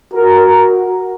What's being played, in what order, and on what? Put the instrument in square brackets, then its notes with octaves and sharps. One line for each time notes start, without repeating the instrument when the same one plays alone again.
[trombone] F#4 [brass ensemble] A#4